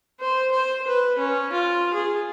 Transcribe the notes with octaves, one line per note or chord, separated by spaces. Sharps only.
C5
C5
B4
C#4
F4
G#4